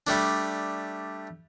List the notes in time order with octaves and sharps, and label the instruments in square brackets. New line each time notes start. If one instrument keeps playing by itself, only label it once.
[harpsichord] G3 A3 D4